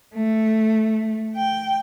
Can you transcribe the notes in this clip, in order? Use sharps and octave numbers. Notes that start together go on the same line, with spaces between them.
A3
G5